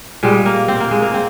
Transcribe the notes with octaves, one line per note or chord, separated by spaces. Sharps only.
A#2 G3 G#3
A#3
C4
A#3
G#3
A#3
C4